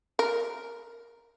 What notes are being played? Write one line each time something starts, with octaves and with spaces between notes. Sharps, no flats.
A#4